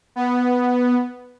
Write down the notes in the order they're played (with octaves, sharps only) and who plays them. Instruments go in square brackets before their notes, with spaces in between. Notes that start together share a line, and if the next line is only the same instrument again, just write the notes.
[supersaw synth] B3